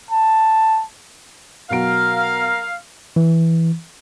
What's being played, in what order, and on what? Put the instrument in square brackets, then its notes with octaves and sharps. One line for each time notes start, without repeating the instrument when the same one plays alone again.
[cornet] A5
[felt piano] B2 F#3 D7 [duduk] A#4 [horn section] F5
[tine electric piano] E3